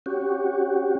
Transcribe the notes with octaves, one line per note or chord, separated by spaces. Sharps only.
C#4 F#4 G4